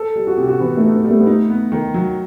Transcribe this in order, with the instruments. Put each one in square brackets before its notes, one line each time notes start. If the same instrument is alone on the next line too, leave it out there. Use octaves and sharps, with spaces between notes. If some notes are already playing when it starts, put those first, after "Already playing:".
Already playing: [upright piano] A4
[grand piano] G3
[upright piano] F#4
[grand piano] C3 [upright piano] G4
[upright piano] F#4
[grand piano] E3 [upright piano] B3
[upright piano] A3
[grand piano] D#4
[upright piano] B3
[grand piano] G3
[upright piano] A3
B3
[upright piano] A3 [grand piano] D#4
[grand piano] B3
D#3
F#3